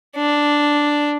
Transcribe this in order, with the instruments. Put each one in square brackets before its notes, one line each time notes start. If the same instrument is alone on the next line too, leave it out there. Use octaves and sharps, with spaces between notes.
[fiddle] D4